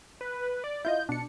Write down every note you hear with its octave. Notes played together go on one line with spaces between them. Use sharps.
B4
D5
E4 F4 D#5 G6
B2 D4 C#7